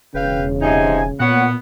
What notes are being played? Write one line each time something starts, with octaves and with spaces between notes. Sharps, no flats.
E1 C#3 B4 F5 G5
C3 F3 D#4 G#5
A#2 B3 C#5 F#5